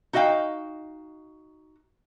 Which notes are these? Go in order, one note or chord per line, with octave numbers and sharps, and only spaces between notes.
D#4 F#4 D#5 F5 G5